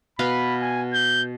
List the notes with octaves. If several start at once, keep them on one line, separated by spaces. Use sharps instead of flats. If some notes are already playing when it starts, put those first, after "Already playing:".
B2 B4 F5 B5
G#5
G6